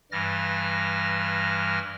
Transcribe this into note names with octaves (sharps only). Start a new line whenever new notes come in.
G2 E3 G3 F6 A6 A#6